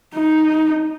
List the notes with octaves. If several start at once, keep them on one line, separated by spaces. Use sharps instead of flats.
D#4